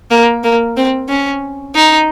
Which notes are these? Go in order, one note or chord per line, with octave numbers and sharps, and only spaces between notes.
A#3
A#3
C4
C#4
D#4